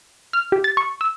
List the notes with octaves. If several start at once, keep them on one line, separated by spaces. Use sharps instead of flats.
F6
G4
A6
C#6
E6